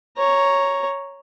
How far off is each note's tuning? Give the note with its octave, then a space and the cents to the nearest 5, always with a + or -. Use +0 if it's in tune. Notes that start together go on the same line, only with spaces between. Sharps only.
C#5 +0 A#5 +0